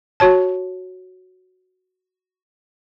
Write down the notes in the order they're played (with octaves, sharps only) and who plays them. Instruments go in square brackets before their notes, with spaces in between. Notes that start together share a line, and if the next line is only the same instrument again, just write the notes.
[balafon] F#4 C#5 A5